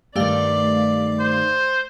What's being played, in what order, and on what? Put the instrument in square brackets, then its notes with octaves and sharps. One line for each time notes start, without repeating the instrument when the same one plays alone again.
[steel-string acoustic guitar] G2 D#3 [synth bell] A3 G4 F5 [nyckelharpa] D5
[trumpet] C5